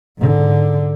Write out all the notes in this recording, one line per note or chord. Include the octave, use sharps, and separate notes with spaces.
G#2 D3